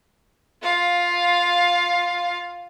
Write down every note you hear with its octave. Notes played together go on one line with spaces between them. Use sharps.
F4 F5